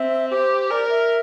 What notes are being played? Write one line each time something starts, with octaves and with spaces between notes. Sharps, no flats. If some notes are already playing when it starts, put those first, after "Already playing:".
Already playing: C4 E5
G4 C5
A#4 D5
E5